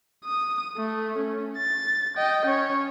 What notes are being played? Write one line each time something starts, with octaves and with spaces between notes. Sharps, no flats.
D#6
A3
C#4
A6
D#5 G5
C#4 C#5